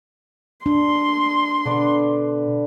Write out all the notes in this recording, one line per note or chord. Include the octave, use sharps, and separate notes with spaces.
D4 C6
B2 D3 B4 D6